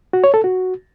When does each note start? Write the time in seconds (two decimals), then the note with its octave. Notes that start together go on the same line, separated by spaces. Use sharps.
0.13 F#4
0.24 C#5
0.34 A4
0.44 F#4